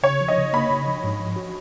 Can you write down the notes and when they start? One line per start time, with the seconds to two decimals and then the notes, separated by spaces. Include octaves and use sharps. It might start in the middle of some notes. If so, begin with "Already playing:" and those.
0.03 C#3 C#5
0.21 F3
0.28 D#5
0.37 C#3
0.53 A#3 B5
0.70 C#3
0.87 F3
1.04 G#2
1.20 F3
1.36 F#4